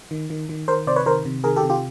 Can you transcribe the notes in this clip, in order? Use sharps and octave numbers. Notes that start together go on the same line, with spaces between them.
D#3
D#3
D#3
D#3 A#4 C5
C3 C5 D5
B4 C#5
D#3 A#4 C5
C3
D#3 G#4 A#4
G4 A4
C3
F4 G4